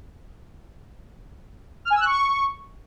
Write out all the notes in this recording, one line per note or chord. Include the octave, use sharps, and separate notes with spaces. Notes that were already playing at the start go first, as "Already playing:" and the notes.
F6
G#5
E6
F#6
C#6